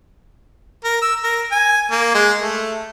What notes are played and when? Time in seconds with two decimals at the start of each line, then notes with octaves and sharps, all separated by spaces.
0.84 A#4
1.02 E6
1.24 A#4
1.52 G#5
1.91 A#3
2.14 G#3
2.41 A3